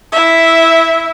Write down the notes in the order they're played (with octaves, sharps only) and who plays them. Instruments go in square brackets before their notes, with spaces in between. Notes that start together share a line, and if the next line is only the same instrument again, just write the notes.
[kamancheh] E4 E5